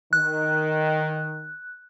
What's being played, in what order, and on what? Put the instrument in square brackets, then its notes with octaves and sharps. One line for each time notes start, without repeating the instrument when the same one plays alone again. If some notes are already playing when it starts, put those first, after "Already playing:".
[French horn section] D#3 [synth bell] F#6